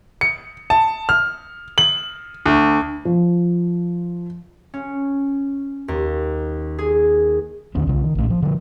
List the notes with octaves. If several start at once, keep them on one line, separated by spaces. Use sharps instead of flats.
C#7
A5
F6
F#7
D2
F3
C#4
D#2
G#4
D#2 D3 D#3 C#4
C2 C#3
D#3
A#1 A2 E3 A3
F3
D3 F3